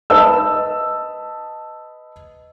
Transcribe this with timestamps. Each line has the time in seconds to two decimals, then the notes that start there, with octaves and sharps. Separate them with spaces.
0.10 B4 D#5 A5 E6